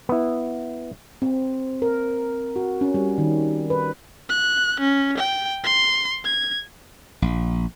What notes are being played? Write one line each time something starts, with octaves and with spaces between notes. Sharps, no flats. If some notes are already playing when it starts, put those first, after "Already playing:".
B3 E4
C4
A#4
F#4
C#4
G3
D#3
B4
F#6
C#4
G5
C6
G#6
A#1